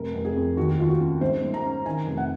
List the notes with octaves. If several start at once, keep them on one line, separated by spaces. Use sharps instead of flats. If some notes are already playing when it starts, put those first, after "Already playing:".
Already playing: F1 A#4
F1
G#4
F2
D#2 F#4
D#2 F4
F#4
C#3
G#2 C5
G#2
A#5
C#4
D#3 G#5
F1
F#5